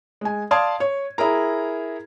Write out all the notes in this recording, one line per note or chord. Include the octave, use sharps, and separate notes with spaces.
G#3 G#5
D5 F5 A5 C6 D#6 G#6
C#5
E4 G#4 A#4 A#5